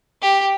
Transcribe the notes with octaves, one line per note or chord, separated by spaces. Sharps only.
G4